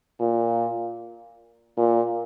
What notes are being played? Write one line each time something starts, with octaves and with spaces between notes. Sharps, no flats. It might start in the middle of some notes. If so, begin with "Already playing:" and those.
A#2
A#2